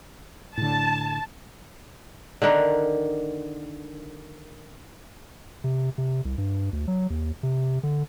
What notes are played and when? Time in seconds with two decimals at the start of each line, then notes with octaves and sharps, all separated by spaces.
0.58 A2 D3 A5
2.42 D3 D#3 D4 A#4
5.64 C3
5.98 C3
6.25 C2
6.38 G2
6.73 D2
6.88 F#3
7.10 D#2
7.43 C3
7.83 D3